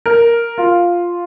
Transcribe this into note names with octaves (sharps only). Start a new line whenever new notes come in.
A#4
F4